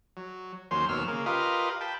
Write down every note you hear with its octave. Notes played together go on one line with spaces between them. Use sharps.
F#3
D#2 F#3 C#4 C5 C6
D#2 B2 F#3 E6 F6
C#3 A#3
F4 G4 A#4 B4 D#5 F5
G5 A5 B5